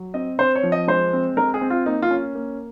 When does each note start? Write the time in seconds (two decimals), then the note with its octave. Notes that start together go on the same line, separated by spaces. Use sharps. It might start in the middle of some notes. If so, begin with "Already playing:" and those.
Already playing: F#3
0.14 C4 D#5
0.39 C4 C5
0.55 C#5
0.63 F3
0.72 D#5
0.88 G#3 C5
1.13 C4
1.37 G#3 A#4
1.54 G#4
1.61 C4
1.70 F4
1.86 A#3 D#4
2.02 F4
2.11 C#4
2.35 A#3